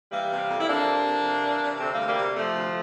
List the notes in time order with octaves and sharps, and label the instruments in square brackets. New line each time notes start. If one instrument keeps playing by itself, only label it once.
[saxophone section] E3 G3 A#3
C3
F2
E4
F2 A#3 D4
C3
F2
C3
E3
C3
D2 A3 C4
C3 G3 A#3
G3 A#3
C3
C3 F3 A3
D2